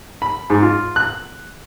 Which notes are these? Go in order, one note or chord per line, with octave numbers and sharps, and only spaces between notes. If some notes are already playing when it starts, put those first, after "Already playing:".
B5
G#2
F4
F#6